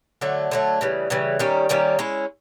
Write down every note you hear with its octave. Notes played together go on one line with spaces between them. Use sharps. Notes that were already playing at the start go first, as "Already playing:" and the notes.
D3 F#3 A3
D3 F#3 A3
C#3 E3 G3
C#3 E3 G3
D#3 G3 A#3 C#4
D#3 G3 A#3 C#4
G#3 C#4 E4